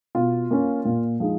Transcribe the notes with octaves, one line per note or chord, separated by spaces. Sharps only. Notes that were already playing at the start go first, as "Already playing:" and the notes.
B2 F4
A#3 C#4
A#2
F3 G#3 D#4